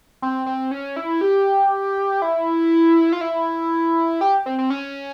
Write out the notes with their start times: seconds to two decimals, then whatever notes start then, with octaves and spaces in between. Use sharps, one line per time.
0.22 C4
0.46 C4
0.71 C#4
0.96 E4
1.21 G4
2.22 E4
3.13 F4
3.21 E4
4.21 G4
4.46 C4
4.58 C4
4.70 C#4